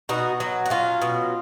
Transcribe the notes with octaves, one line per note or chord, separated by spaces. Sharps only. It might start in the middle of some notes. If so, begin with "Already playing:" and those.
B2 D#4 F#4
F#3
F#4
F#3 C#4 F4
B2